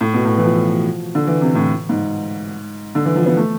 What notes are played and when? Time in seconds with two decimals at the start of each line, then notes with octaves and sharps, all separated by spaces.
0.01 A2
0.14 B2
0.25 A2
0.37 E3
0.44 F3
1.15 D3
1.27 E3
1.41 C3
1.55 A2
1.89 G#2
2.95 D3
3.05 E3
3.16 F3
3.26 B3
3.37 A3